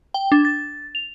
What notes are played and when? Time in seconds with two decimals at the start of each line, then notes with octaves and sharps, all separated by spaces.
0.14 G5
0.32 D4
0.45 A6
0.95 F7